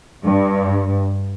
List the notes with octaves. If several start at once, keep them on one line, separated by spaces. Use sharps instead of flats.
G2